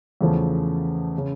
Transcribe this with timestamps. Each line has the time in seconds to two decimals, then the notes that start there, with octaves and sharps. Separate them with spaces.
0.21 E2 C#3 F3 A3 C#4
1.18 C#3